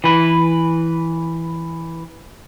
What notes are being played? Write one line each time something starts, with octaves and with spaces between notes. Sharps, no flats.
E3 B4